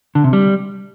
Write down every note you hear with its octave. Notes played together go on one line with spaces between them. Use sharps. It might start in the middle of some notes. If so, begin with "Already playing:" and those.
D3
C3
G3